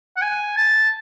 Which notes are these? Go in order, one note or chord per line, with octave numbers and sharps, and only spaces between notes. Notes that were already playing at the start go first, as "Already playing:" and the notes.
F#5
G#5
A5